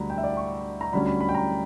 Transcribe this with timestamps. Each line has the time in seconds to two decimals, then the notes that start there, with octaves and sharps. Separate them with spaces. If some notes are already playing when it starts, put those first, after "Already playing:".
Already playing: D2 D3 G3 A#5 B5
0.10 G5
0.18 E5
0.24 D5
0.37 C#6
0.81 A#5
0.93 D2 D3 G3 C#4 B5
1.06 B5
1.21 B5
1.29 G5
1.35 A#5